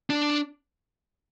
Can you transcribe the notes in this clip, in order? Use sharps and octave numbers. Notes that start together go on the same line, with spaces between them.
D4